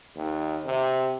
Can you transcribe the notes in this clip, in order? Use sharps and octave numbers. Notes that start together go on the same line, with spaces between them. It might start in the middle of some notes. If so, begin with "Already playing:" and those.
D#2
C3